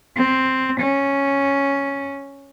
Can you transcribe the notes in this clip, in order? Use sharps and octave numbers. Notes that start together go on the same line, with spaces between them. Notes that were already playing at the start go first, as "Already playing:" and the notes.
C4
C#4